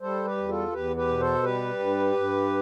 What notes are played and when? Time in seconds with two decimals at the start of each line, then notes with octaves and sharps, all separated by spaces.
0.01 G3 A4 C5
0.25 G4 B4
0.37 E2
0.49 F4 A4
0.72 E2 G4 B4
0.96 G4 B4
1.08 B2
1.20 A4 C5
1.43 G3 G4 B4
1.79 G2
2.15 G2